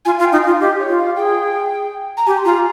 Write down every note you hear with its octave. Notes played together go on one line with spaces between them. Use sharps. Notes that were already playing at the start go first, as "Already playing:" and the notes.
F4 G#5
F4 F5
G5
D#4
F4 F5
G4 D#5
C#5
F4
F5
G#4 G5
A#5
G4 G#5
C6
F4 A#5